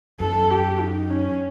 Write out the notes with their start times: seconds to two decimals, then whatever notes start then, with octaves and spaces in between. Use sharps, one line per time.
0.20 F#2 A4
0.50 G4
0.80 D#4
1.10 C#4